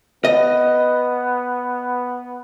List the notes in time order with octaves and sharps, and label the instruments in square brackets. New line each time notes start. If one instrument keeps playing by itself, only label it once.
[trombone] B3 [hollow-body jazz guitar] D#5